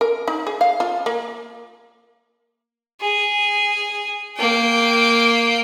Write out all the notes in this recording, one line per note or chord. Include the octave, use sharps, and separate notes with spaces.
A#4
D#4
G#4
F5
F4
A#3
G#4
A#3 G5